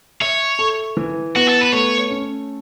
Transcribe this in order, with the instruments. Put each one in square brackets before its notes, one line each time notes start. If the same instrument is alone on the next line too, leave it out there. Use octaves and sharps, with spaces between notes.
[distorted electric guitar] C#5 [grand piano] E5
[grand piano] A4
E3
[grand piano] B3 [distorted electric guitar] F#4
[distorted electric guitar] A4
B4
[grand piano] A3 [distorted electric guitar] C#5
[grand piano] C#4